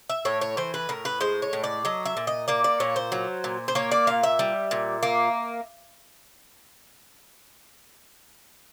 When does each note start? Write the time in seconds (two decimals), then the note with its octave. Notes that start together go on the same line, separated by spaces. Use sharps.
0.10 E5
0.25 A2 C#5
0.41 C#5
0.57 E3 C5
0.74 B4
0.89 A2 A#4
1.05 B4
1.21 G#3 C5
1.42 C#5
1.53 A2
1.64 D5
1.85 F#3 D#5
2.06 E5
2.17 A#2
2.27 D#5
2.48 A#3 D5
2.64 D5
2.80 A#2 C#5
2.96 C5
3.12 F#3
3.44 A#2
3.68 C5
3.75 A#3 C#5
3.92 D5
4.07 A#2 F5
4.23 E5
4.39 G3
4.71 A#2
5.03 A#3